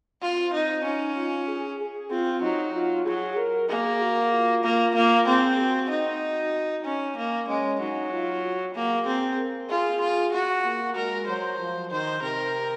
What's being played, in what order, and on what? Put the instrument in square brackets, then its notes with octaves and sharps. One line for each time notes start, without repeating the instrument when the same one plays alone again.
[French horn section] C4 [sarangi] F4
[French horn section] C4 [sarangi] D#4
[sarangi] C#4 [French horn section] D#4
[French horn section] F4
G#4
G#4
[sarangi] C4 [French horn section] F4
[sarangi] F#3 [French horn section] D#4
[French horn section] F4
[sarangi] F#3 [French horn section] G#4
[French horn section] A#4
[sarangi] A#3 [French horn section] G#4
[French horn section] F#4
F4
[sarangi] A#3
[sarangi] A#3 [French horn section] F4
[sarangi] C4 [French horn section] G#4
[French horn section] F#4
[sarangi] D#4
C#4
A#3
[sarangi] G#3 [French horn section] C#4
[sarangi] F#3 [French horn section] D#4
[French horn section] F4
F#4
[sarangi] A#3 [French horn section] G#4
[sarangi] C4 [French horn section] G#4
[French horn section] A#4
[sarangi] F4 [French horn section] G#4
[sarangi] F4
F#4
[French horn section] A#3
[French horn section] G#3 [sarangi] A#4
[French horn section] F#3 [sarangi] C5
[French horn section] F3
[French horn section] D#3 [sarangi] C5
[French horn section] C3 [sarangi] A#4